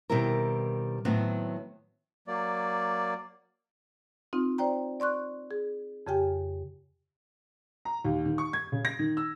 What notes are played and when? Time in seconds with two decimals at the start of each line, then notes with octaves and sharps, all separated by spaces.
0.10 B2 D#3 G3 C4 E4 A#4
1.05 A2 D#3 F#3 B3 C4
2.27 F#3 A#3 D5
4.33 C4 D#4 F4
4.58 C5 D5 G5 A#5
5.00 D5 C6 C#6 F#6
5.51 G#4
6.07 F2 C#3 G4 G5 G#5
7.85 A#5
8.05 D#2
8.25 D#3
8.38 C#6
8.53 G#6
8.72 C#3
8.85 A#6
8.99 D#3
9.17 E6